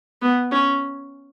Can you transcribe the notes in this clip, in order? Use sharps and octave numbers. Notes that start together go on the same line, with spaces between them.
B3
C#4